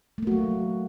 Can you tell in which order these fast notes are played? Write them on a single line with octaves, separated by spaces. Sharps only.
A3 A#3 F#4 F#3